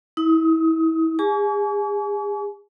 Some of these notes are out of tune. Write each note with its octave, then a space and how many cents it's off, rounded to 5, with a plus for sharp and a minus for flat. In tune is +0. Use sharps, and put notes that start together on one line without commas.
E4 -30 D#6 +25
G#4 -40 G#5 +35 C#6 +45